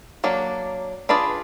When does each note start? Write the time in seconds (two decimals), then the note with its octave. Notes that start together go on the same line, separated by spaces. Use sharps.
0.24 F#3 A#3 D4
1.09 D4 F4 G#4 B4 D5